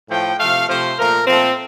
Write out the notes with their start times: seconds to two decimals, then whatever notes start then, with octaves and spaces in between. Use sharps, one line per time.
0.09 A2 F3 A3 G5
0.39 C3 F3 A3 F5
0.69 C3 F3 A3 C5
0.97 A#2 F3 A3 A#4
1.26 A#2 F3 A3 C4